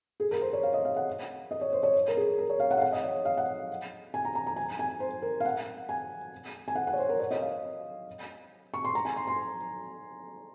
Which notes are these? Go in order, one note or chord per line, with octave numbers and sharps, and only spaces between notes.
G#4
A#4
C5
C#5
F5
D#5
F5
F#5
D#5
C#5
C5
C#5
A#4
G#4
A#4
C#5
F5
F#5
F5
F#5
D#5
C#5
F5
F#5
G#5
A#5
A#5
A#5
G#5
G#5
C5
A#4
F5
F#5
G#5
G#5
F#5
F#5
C#5
C5
A#4
C#5
D#5
F5
C#6
C6
A#5
G#5
C6
C6